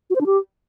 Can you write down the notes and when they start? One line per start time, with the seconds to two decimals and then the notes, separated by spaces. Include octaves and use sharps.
0.10 F#4
0.15 C5
0.21 D4
0.26 G4